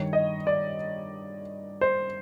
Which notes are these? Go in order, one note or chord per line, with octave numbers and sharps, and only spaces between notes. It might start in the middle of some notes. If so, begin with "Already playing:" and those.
Already playing: G2 D#3 C#5
D#5
D5
C5